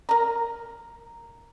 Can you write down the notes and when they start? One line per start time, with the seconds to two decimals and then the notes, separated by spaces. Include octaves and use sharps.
0.09 A#4 A#5